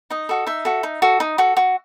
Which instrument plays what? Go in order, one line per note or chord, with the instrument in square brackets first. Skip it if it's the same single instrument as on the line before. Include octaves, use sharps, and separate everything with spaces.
[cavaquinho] D#4 D#5
F#4 A4
D#4 E5
F#4 A4
D#4
F#4 A4
D#4
F#4 A4
F#4